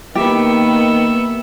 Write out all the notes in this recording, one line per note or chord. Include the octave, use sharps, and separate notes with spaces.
D#3 A#3 B3 G4 E5